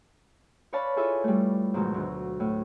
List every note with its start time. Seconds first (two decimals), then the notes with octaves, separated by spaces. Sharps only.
0.73 B4 C#5 D5 F5 A5 B5
0.96 E4 F4 G#4 A4 B4 E5
1.24 G3 A3
1.74 G#2 B2 D#3 F#3
1.94 D2
2.40 A2